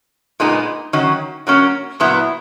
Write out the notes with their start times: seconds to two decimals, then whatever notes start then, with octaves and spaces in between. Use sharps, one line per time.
0.40 A#2 G#3 B3 D#4
0.93 D#3 F#3 C#4
1.47 F#3 A#3 C#4
2.00 A#2 F#3 B3 E4